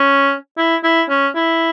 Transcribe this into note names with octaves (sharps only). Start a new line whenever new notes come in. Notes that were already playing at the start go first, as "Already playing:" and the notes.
Already playing: C#4
E4
E4
C#4
E4